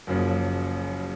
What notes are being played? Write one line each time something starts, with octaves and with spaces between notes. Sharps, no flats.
F#1 F#2 C#3 F3 A#3